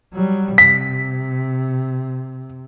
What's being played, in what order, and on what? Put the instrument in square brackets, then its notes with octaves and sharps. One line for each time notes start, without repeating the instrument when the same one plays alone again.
[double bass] F#3 G3
[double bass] C3 [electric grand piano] B6